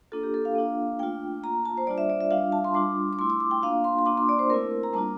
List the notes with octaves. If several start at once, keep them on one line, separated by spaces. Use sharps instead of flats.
A#3 D4 F4 A4
G4
A4
F5
A#3 D4 F4
A3 D4 F4 G5
A#3 F4 A#5
A5
C5
G3 D4 F4 D5
E5
D5
E5
G3 D4 F4 F5
A5
C6
G3 D4 F4 D6
D6
A3 E4 C6
D6
D6
G5
A#3 D4 F4 F5
C6
C6
A#3 D4 F4 D6
C6
D5
C5
A3 C4 E4 A#4
A#5
G3 A#3 D4 F4 A5